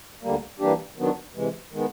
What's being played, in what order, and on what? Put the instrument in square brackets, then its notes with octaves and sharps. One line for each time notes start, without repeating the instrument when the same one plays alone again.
[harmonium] D2 D3 G3 A#3
E3 G3 A#3 D4 G4
D#3 F#3 B3 D4
C3 E3 G#3
D#3 G#3 B3